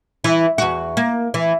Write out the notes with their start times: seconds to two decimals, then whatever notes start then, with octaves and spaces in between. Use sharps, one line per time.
0.24 E3
0.58 E2 F#4
0.97 A#3
1.34 E3